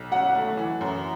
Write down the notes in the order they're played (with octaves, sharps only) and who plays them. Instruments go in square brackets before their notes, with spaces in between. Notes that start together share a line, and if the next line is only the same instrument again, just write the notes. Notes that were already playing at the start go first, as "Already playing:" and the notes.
Already playing: [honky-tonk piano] B1
[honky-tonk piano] F#3 [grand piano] F#5
[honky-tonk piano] A3
E3
F#2